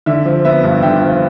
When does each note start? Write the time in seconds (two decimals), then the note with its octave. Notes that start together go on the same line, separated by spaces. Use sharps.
0.06 D3 E5
0.26 F3
0.45 B3 E5
0.63 G2
0.82 D3 E5 G5
1.01 F3